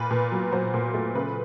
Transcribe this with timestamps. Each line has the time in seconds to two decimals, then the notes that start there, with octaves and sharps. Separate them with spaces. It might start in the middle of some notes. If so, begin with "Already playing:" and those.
Already playing: A#2 B4
0.11 A#2
0.32 F#3
0.52 F#3 C5
0.74 A#2
0.94 A3
1.15 C#3 B4